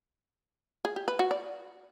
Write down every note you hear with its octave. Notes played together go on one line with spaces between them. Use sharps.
G#4
G4
B4
F#4
D5